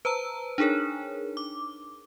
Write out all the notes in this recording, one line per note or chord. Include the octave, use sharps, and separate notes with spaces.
B4 C5 A5 A#5 E6
D4 D#4 G#4 A#4 C#5
D6